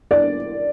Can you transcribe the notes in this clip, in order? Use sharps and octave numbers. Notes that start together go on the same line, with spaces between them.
D5